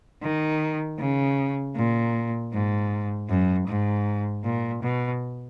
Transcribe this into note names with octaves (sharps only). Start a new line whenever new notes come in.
D#3
C#3
A#2
G#2
F#2
G#2
A#2
B2